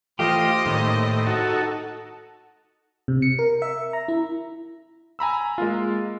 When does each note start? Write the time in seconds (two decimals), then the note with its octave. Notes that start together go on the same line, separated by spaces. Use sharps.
0.19 E3 A3 F4 G4 C5 D#5
0.66 A2 D#3 A#3 C#5
1.26 D#4 F#4 A4
3.08 C3
3.22 C#7
3.39 A#4
3.62 E5
3.93 A#5
4.08 E4
5.19 G#5 A#5 B5 E6
5.58 G#3 A#3 F4